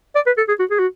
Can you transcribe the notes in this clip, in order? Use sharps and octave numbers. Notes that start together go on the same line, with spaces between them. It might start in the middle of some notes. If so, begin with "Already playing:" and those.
D5
B4
A4
G#4
F#4
G#4
F#4